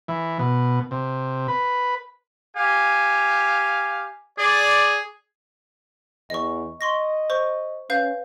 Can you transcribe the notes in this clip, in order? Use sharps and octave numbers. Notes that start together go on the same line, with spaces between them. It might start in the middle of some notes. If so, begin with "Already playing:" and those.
E3
B2
C3
B4
G4 F5 G#5
G#4 D5
E2 D#5 C#6
D#5 C6 C#6 A#6
C5 C#6
C#4 B4 F5 G6